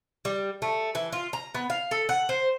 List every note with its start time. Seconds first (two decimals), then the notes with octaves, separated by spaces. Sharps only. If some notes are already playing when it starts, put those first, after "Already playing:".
0.25 G3
0.62 A3
0.95 E3
1.12 F4
1.33 A#5
1.55 B3
1.70 F5
1.91 A4
2.09 F#5
2.29 C5